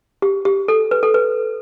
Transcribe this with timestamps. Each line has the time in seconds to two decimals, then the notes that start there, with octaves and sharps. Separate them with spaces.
0.22 G4
0.45 G4
0.68 A4
0.91 B4
1.03 A4
1.14 B4